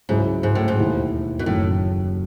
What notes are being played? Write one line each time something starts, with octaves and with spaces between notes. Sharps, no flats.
C#2 G#2 C#3 F#3 C#4 E4
G#2
A2
G#2
E1 D#2 D#3 A3 E4
B2
F#1 F#2 A2 D#3